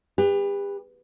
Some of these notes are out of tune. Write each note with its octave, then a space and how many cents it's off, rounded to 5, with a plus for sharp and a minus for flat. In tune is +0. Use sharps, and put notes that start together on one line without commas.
G4 +40 B4 +0